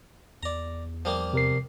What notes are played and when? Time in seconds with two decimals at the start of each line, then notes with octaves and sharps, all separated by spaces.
0.43 E2 D5 A#5
1.05 F3 G3 A#3
1.33 C3 A#4 C7